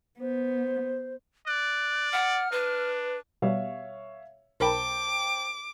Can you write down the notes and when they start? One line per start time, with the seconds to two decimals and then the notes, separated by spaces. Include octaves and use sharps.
0.20 B3 C5
1.47 D5 F#6
2.12 F#5 F6
2.52 D4 B4
3.42 B2 G3 C#5 E5 F5
4.60 B1 A#4 C5 G5 A5 B5 D6